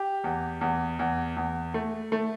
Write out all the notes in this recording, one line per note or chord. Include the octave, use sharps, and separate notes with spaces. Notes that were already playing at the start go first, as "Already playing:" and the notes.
Already playing: G4
E2
E2
E2
E2
A3
A3